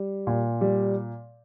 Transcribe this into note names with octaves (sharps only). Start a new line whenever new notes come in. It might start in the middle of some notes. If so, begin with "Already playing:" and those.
Already playing: G3
A#2
G3